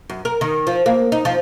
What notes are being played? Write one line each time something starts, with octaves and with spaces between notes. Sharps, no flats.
F#2
A#4
D#3
F3
A#3
D#4
F3